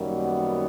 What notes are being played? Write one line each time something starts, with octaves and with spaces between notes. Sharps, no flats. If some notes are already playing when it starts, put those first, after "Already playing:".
Already playing: F#2 D#3 G3 A#3
B3